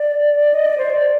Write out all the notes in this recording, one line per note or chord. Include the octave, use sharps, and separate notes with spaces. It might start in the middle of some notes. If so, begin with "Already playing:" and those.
Already playing: D5
D#5
D5
C5
D5